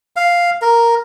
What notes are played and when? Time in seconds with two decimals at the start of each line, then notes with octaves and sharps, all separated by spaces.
0.16 F5
0.62 A#4